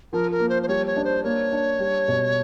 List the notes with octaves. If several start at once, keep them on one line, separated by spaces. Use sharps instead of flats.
F3 A#4
A#4
A#3
C5
C5
G3 C#5
C#5
D4
C5
A#3 C#5
D4
G3
B2